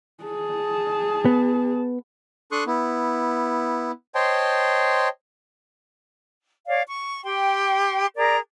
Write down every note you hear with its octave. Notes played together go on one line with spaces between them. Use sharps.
G#4 A5
B3
D4 A4 C6 C#6 D#6 F#6
B3 E4
C5 C#5 D#5 G5 A5 C6
C#5 D5 F5
C#6
G4 G5 C6
G#4 A#4 D5 A#5